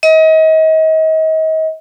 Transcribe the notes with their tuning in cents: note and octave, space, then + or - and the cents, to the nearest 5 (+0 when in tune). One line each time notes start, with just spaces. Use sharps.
D#5 +35